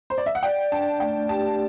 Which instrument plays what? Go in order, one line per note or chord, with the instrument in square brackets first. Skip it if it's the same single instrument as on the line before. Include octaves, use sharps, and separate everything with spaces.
[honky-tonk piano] C5
D5
E5
F#5
[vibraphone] D5 [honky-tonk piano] G5
[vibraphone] D4 [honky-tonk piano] A5
[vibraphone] A3 [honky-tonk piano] G5
[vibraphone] G4 [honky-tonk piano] A5